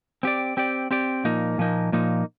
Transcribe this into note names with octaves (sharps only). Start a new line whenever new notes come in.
C4 G4 D5
C4 G4 D5
C4 G4 D5
A#2 F3 A#3 D#4
A#2 F3 A#3 D#4
A#2 F3 A#3 D#4